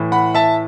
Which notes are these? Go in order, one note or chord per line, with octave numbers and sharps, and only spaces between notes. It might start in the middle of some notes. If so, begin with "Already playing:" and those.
Already playing: A2 E3
F#5 B5
E5 A5